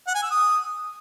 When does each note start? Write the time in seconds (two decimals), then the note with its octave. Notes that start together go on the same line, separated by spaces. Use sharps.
0.07 F#5
0.15 G#5
0.23 E6
0.30 D#6